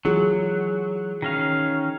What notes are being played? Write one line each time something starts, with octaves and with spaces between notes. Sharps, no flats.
E3 F#3 F4 G#4
D#3 C#4 F5